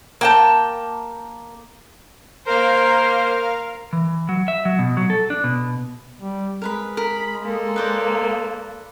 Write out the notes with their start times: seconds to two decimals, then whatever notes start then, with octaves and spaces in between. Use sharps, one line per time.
0.21 A#3 G5 A5
2.46 A#3 A#4 C5 F5 F6
3.93 E3
4.29 F#3
4.48 E5
4.65 F#3
4.79 B2
4.97 F#3
5.10 A4
5.30 D4
5.44 B2
6.20 G3
6.62 G#3 A#4 B4 B5
6.97 A#4 B5
7.42 A#3 A4
7.76 B4 C5 D5